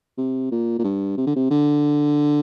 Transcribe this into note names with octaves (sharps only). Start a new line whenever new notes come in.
C3
A#2
A#2
G2
C3
D3
C3
D3